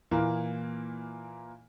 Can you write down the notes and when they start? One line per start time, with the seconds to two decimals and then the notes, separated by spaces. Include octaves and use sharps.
0.11 A#2 E3 A#3